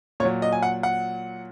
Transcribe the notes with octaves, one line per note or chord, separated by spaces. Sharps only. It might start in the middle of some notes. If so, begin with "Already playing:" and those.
A#2 F#3 C#5
D#5
G#5
F#5
F#5